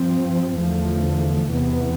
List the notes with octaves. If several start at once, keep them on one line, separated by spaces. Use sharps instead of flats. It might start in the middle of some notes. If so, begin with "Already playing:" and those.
Already playing: G2 F3 C4
E2 D3 F3 A3
E2 C3 E3 B3